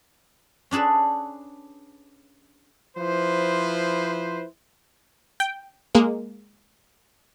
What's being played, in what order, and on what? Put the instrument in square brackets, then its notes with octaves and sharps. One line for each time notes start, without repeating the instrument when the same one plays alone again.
[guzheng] C#4 D4 G#4 A4 B4
[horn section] F3 E4 B4 C5
[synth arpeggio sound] G5
G#3 A#3